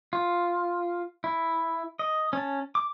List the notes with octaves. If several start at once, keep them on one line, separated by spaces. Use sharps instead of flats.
F4
E4
D#5
C#4 A5
D6